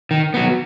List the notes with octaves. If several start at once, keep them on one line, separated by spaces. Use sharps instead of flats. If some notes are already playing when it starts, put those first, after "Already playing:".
D#3
F#3 B3